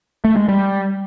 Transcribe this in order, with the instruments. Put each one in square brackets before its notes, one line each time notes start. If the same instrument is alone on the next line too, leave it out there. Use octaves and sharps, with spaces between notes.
[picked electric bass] A3
G#3
G3